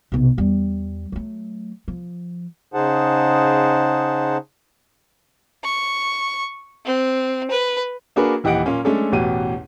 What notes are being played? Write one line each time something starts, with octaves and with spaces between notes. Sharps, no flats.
B1 C3
E2 G3
F#3 A3
F3
C#3 D#4 G#4 C5 F#5 A5
C#6
C4
B4
A#3 D4 F#4 G#4 A#4 B4
D#1 E3 G4 D#5 F#5 D7
A#2 A#3 C#4
G#3 A3 C#4 D4 A4
A1 E2 B2 G4 D#7